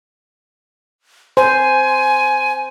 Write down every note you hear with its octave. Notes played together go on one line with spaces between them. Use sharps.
C5 G#5